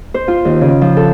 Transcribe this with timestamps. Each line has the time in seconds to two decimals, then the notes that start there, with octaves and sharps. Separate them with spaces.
0.14 C5
0.28 F4
0.45 D#2
0.61 C#3
0.81 F3
0.97 A4